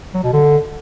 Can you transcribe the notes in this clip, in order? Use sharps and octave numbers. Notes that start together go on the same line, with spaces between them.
F#3
B2
D3